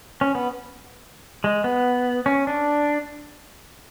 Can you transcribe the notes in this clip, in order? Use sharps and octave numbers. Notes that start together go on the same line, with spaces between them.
C#4
B3
G#3
B3
C#4
D4